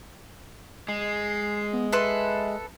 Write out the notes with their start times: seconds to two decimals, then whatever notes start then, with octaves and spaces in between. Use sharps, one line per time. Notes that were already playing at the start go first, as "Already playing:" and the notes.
0.89 G#3 C7
1.73 B3
1.92 A4 B4 E5 C6